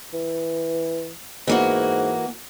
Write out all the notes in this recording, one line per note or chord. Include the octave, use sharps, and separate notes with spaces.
E3
G#2 E3 A#3 F#4